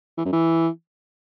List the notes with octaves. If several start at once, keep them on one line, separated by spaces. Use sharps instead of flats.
E3
F#2
E3